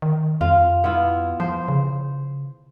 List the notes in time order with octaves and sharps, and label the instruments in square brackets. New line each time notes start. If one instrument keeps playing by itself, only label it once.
[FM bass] D#3
[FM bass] F2 [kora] F4
[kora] B3 E4 F4
[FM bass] F3 [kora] C5
[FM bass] C#3